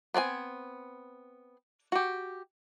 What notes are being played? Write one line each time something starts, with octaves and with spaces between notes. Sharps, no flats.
B3 C4 D5 G#5
F#4 G4